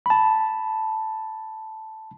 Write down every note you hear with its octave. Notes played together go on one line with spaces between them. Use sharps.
A5 B5